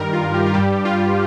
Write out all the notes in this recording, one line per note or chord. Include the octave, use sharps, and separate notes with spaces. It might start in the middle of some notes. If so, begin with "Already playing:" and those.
Already playing: G2 D#3 G3 A#4
F4
G4
F4
G2 G3 G4
F4